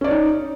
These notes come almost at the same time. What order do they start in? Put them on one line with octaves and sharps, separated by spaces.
C#4 D5 C#5 D#4